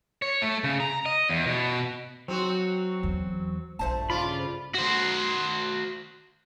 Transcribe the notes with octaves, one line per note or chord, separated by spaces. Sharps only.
C#5
A3
C#3
A#5
D#5
E2
B2
F#3 C4 F#4
E2
A#1 G2 A3 C5 A5
C#3 F4 D5 B5
F#4 C5